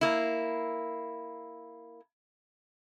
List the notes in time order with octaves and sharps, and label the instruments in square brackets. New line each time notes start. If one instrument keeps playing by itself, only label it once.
[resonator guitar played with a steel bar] A#3 E4